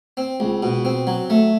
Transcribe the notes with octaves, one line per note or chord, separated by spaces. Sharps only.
C4
C#2
B2
C4
F#3
A3